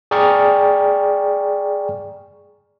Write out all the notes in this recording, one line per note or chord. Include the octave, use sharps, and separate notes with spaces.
G#4 D5 G5 A#5 C#6 F6